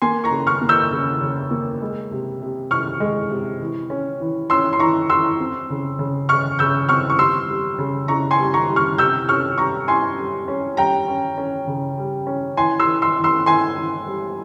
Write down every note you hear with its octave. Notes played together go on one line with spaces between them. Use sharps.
A#3 G#5 C6
A#5 C#6
C#3
C#6 F6
A#3
E6 G6
C#3
C#3
A#3
G#3
C3
C3
C3 C#6 F6
G#3
C3
E3
C#4
E3
C#4 C6 E6
C6
E3 A#5 C#6
E3 C6 E6
C4
C#3
C#3
C#3 C#6 F6
C#3 E6 G6
C4 C#6 F6
C#6
G3 C6 E6
G3
C#3
C#3 A#5 C#6
G#5 C6
G3
A#5 C#6
G3
C#6 F6
C3 E6 G6
C#4 C#6 F6
G3 A#5 C#6
G3 G#5 C6
G3
C#4
G3 G5 A#5
C#4
C#4
C#3
G3
C#4
E3 G#5 C6
C6 E6
E3
C6 E6
E3
C6 E6
E3 G#5 C6
E3
G3